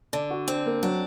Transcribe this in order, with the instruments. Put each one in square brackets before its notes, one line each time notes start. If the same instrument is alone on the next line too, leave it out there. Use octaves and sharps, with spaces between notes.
[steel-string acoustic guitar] D3 [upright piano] D5
[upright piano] F#4
[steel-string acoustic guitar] C4 [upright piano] D4
[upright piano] A#3
[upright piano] F#3 [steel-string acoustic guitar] D4